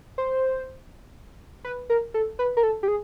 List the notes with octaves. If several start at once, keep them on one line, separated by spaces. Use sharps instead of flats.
C5
B4
A#4
A4
B4
A#4
A4
G4
G#4